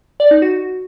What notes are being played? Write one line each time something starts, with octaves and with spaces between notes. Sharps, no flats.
D5
D#4
F#4